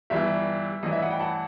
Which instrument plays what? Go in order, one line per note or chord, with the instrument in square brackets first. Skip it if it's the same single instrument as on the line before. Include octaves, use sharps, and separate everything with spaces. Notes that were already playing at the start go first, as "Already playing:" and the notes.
[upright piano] G1 G2 E3 G3 E5
A1 G2 E3 D#5
E5
D#5 F#5
G5 B5
F#5 A5